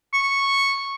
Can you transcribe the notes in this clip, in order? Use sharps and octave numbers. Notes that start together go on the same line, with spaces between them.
C#6